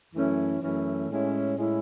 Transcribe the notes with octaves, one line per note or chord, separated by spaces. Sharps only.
F#2 E3 A3 C#4 E4
F#2 E3 A3 C#4 E4
A2 G#3 C#4 E4
A2 G#3 C#4 E4